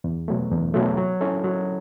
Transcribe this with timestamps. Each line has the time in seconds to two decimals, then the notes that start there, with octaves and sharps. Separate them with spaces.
0.04 E2
0.28 B2 F#3 A3
0.51 E2
0.74 B2 F#3 A3
0.98 F#3
1.21 C#4 E4 A4
1.44 F#3